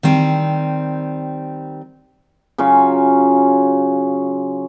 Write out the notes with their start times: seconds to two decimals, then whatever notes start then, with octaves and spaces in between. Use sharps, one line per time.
0.03 D#3 G3 C4
2.58 C#3 F#3 C#4 F4